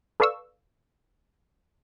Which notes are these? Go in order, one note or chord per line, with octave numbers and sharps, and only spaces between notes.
A4 B4 D5 F5 C#6 E6